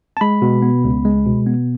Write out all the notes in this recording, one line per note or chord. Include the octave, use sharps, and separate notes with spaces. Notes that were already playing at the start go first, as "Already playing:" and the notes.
A5
G#3 B5
B2
B3
C#2
G#3
B2
B3